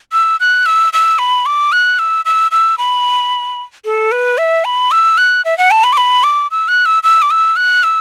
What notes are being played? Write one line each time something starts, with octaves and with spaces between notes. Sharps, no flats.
E6
F#6
E6
E6
B5
D6
F#6
E6
E6
E6
B5
A4
B4
E5
B5
E6
F#6
E5
F#5
A5
B5
D6
B5
D6
E6
F#6
E6
E6
D6
E6
F#6
E6